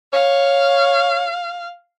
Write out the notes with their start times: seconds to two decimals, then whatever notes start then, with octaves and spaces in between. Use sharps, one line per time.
0.14 C#5 F5